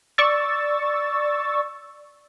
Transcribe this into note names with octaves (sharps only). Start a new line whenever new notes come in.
D5 C#6 E6 A6